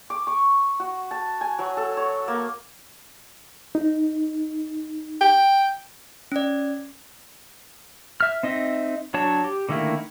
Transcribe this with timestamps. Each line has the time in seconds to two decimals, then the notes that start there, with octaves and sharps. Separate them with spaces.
0.10 D6
0.27 C#6
0.80 F#4
1.11 A5
1.41 G#5
1.59 F#3
1.77 A4
1.97 C#5
2.28 A#3
3.75 D#4
5.21 G5
6.32 C#4 D5
8.21 E5 F6
8.43 C4 D#4 D#5 E5
9.14 F#3 D4 C#5 A5
9.44 G4
9.69 D3 D#3 A3 A#3 E4